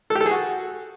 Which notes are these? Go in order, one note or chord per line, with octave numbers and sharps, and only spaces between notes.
A4
G4
A4
G#4
F#4